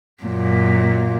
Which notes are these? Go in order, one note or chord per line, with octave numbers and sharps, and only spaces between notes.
F#2 A#2